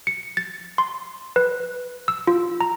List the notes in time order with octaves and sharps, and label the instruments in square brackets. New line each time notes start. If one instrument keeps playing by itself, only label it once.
[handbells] C#7
A6
C6
B4
E6
F4
A#5